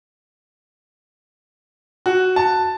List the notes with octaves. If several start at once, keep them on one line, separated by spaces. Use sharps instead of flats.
F#4
A5